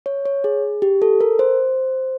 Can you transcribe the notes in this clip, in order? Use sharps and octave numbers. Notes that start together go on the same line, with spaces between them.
C#5
C#5
G#4
G4
A4
A#4
C5